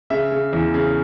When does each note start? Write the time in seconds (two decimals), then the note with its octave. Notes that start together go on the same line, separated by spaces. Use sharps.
0.10 C#3 E5
0.31 C#3
0.53 E2
0.74 C#3